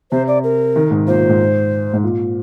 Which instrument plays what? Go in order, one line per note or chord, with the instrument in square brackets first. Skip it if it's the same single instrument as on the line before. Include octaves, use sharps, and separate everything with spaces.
[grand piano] C3 [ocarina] C5
[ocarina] D5
A#4
[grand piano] D#3
G#2
[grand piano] A#2 [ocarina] C5
[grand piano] A#2
G#2
G#2
A#2